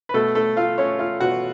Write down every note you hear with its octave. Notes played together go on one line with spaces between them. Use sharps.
B4
B2 A3 A4
A3 A4
A3 F4 F5
A3 C#4 C#5
A3 F4 F5
B2 F#4 F#5